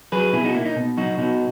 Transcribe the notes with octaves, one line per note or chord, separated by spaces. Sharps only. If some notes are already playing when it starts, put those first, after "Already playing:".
F#3 G#4 B4
B2 E4 G#4
D#4 F#4
A#3 E4
D#4
B2
F#3 D#4 F#4
B2 D#4 F#4